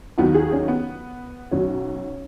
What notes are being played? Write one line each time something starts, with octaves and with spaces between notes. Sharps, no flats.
D#2 D#3 F#3 B3
G#4
C#4
B3
B1 B2 F#3 C#4